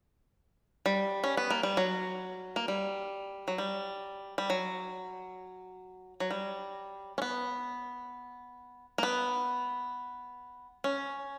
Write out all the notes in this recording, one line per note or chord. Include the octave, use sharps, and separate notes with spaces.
G3
C#4
B3
A#3
G3
F#3
A#3
G3
F#3
G3
G3
F#3
F#3
G3
C#4
B3
A#3
B3
C#4